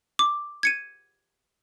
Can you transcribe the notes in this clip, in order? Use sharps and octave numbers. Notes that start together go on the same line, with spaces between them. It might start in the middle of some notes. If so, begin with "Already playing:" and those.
D6
G#6 C#7 D#7